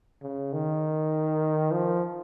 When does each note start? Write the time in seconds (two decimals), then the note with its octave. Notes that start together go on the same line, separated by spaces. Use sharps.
0.23 C#3
0.53 D#3
1.72 F3